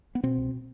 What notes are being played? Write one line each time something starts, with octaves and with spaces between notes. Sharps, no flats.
B3
B2 C4
C2